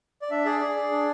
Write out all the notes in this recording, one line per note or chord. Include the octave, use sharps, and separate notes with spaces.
D5
D4 E5
G#4 D5
G#4
G#4
D4